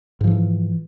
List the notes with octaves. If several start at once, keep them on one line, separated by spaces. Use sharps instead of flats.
G#2 E3 F3